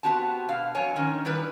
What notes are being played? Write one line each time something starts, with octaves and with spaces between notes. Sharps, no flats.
B3 C4 F#4 G4 A5
B2 F5
F2 F#3 C#5 G#5
G#2 D#3 C#4
D#3 G3 E4 B4